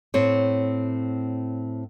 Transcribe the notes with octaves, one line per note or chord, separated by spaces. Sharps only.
A2 C4 C#5